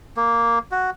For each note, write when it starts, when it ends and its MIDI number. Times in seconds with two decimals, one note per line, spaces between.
0.17 0.59 58
0.71 0.90 66